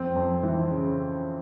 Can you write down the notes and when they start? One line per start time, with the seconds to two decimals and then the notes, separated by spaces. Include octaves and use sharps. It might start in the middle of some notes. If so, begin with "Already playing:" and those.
Already playing: F2 C4
0.16 F2
0.43 E3
0.70 C#3